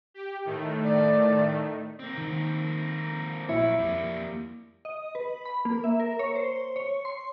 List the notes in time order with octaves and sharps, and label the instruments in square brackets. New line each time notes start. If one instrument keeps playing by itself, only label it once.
[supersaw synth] G4
A2 D#3 A3
[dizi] D5
[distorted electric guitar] A#3 C4
[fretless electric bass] D#3
[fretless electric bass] A#1 [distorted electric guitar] F#2 C#5 [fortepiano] E4
[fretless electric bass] F2 [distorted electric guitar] G3 A#3
[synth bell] D#5
B4
B5
A#3
E5
A#4
C#5
C5
C#5
C6